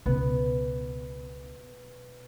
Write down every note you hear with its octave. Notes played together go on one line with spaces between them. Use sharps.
C#2 B2 B3